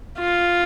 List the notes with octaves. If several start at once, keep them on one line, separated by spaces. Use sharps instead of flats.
F4